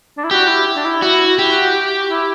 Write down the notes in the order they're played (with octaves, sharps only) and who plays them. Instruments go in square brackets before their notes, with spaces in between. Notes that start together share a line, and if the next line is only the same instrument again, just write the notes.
[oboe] D4
E4
[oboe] F#4 [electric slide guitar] G4
[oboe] E4
D4
E4
[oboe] E4 [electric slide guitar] F#4
[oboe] E4
[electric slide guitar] G4
[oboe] F#4
E4